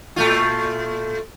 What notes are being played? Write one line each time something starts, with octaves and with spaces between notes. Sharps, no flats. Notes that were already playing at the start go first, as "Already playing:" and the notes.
A#2 A3 F4